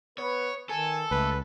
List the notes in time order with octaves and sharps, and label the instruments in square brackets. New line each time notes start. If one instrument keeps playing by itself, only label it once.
[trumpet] B3 [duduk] B4 [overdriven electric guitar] C#5
[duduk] D#3 [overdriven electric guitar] A4 [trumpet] G#5
[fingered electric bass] C#2 [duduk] A3 [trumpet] B4